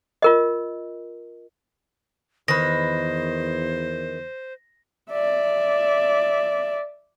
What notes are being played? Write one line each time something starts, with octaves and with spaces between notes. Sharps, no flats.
F4 A#4 D#5
E2 D#3 B4 C5 A#6
D5 E5